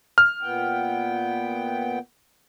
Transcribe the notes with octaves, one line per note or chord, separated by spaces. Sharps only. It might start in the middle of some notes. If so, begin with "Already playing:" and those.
F6
A#2 B3 G5